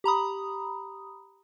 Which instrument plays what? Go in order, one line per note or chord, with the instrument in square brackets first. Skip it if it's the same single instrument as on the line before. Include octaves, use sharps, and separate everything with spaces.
[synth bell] G4 A#5 B5 D#6